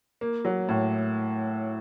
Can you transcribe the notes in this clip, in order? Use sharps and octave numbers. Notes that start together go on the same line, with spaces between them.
A#3
F#3
A2